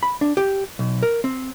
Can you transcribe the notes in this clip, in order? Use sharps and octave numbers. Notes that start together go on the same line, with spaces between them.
B5
D4
G4
B1
A#4
C4